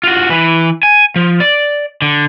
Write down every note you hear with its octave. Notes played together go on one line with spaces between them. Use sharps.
F4 F#4
E3 B4
G#5
F3
D5
D3